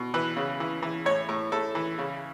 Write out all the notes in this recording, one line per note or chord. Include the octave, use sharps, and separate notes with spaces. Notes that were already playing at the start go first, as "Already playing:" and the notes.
Already playing: B2
E3 B4
C#3
E3
E3
A2 C#5
A2
A2 A4
E3
C#3